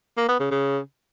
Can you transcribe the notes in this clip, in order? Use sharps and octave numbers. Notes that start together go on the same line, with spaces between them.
A#3
B3
C#3
C#3